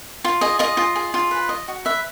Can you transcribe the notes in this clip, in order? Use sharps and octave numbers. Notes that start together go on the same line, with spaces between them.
F4
G#4 D#5
F4 D#5
F4
G#4
F4
B4
D#5
F#4
B4 E5